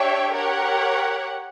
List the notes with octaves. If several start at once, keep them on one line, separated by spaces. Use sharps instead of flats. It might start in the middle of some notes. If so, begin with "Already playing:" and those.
Already playing: D4 G4 C#5 E5 G5
G4 A#4 C#5 F#5